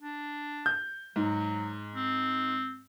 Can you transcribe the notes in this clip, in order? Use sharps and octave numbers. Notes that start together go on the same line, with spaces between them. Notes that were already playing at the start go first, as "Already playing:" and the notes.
D4
G6
G#2 F#3
C4